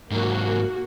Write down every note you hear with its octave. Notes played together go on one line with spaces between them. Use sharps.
G#2 F#3 A#3 F#4